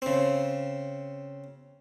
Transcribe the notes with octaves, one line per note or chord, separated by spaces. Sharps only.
C#3 C4